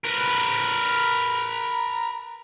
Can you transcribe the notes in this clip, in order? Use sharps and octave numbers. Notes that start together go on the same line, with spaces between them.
A#4 B4